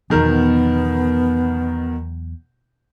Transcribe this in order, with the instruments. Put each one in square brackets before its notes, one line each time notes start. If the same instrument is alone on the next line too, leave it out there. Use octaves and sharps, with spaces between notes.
[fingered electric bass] E2 F#3 [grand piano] B2 D#3 A#4 [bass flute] B3